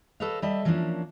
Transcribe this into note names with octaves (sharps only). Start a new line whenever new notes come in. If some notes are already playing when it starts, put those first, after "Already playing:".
A4 B4 C#5 D#5 F5
G3 A4 D#5 E5 A5
E3 F3 A#3 C#4 D4